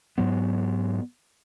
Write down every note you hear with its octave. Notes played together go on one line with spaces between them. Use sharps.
G#2 F#3 B3